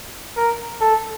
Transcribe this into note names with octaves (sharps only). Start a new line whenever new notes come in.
A#4
A4